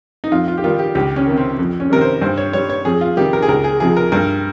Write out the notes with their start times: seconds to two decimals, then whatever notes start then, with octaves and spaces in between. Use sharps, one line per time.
0.24 D#4
0.32 F2 F4
0.48 F4
0.58 G4
0.64 D#3 G3 F4
0.79 G4
0.95 C#2 G4
1.16 C#4
1.27 C3 D#3
1.38 C4
1.59 F2
1.80 C#4
1.90 C3 D#3 G3 A#4
2.01 C5
2.22 G2 C5
2.38 C#5
2.53 G3 C#5
2.70 C#5
2.85 F2 G#4
3.01 F4
3.17 C3 D#3 G3 G4
3.33 A#4
3.42 G#4
3.48 C#2 A#4
3.64 G#4
3.80 C3 F3 G#4
3.97 A#4
4.12 G2 A#4